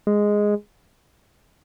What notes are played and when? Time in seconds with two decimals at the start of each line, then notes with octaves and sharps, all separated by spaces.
0.07 G#3